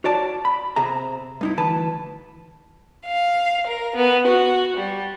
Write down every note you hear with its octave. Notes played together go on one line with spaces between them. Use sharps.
F#4 C#5 D5 A5
B5
C3 G#4 E5 A#5
G2 D#4 E4
D2 E3 B4 A5
F5
A#4
B3
F#4
G3